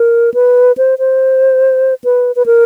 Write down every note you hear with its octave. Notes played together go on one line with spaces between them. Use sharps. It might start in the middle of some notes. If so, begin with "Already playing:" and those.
Already playing: A#4
B4
C5
C5
B4
B4
A#4